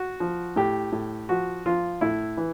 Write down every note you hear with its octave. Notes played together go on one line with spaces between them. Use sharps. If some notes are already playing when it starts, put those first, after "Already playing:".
Already playing: F#4
F3
A2 G4
A2
F3 F#4
F3 F4
A2 E4
E3